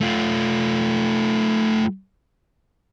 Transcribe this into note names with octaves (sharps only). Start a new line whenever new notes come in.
A3 F4